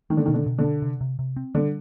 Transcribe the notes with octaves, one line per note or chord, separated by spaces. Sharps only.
D#3 G#3
D3
D#3
B2
D3
B2
D3
D4
C3
C3
C3
C4
D3 G3